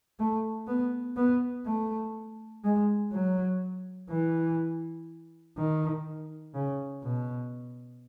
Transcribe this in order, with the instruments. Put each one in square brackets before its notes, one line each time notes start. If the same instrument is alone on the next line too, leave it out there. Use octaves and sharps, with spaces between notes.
[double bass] A3
B3
B3
A3
G#3
F#3
E3
D#3
C#3
B2